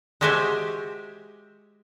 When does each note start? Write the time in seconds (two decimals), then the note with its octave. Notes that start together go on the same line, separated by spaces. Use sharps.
0.21 G#3 F#4 G4 C5 E5 G#5